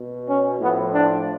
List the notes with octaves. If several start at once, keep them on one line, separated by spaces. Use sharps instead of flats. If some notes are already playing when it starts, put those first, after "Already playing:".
Already playing: B2
C#4
A2 F3 B3
D4